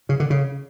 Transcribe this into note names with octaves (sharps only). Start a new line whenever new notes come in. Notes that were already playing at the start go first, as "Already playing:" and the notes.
C#3
D3
C#3